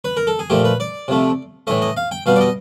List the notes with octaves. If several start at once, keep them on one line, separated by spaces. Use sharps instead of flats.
B4
A#4
A4
G#4
A#2 F3 A3 G4
B4
D5
C3 F3 A3
A2 E3 A3 D#5
D#5
F5
G5
B2 G3 B3 F5
D5
D#5